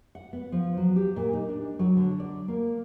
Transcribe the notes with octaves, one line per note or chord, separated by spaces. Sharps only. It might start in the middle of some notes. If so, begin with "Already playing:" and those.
F#5
B3
F3
F#3
G4
A#2
D#4
D4
F#3
D3
D5
A#3